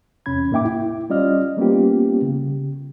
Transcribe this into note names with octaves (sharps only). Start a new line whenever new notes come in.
E2 C3 C#4 B5 G#6
A2 A#3 D#4 E5 G5 D6
E4
G3 C#4 F4 D5 D#5 F6
G3 A#3 B3 C#4 F4 G4
C#3